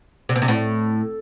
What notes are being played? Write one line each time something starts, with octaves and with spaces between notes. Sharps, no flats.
C3
B2
C3
A2